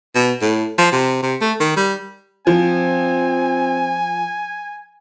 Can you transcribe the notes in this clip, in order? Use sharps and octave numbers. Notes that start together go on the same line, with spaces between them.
B2
A2
F3
C3
C3
A3
D#3
G3
F3 C4 G#5